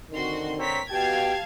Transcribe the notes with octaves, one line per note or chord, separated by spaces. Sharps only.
D3 D#3 C4 F#4 C6
C4 A#4 C#5 A#5 B6
B2 G4 F5 G5 A5 G#6